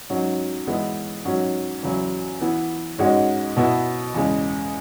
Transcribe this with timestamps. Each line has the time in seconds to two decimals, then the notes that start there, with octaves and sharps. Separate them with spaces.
0.10 G#2 F#3 C#4 F#4
0.67 E3 G#3 B3 E4
1.25 G#2 F#3 C#4 F#4
1.83 E2 C#3 F#3 E4
2.41 E3 B3 E4
2.99 G#2 G#3 C#4 F#4
3.57 B2 B3 E4
4.14 E2 C#3 G#3